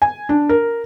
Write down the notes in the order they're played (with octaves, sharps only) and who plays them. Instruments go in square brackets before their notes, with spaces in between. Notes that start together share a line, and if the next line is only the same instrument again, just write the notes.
[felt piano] G#5
D4
A#4